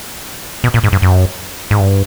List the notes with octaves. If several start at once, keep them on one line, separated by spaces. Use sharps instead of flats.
B2
A#2
G#2
G2
F#2
G#2
G2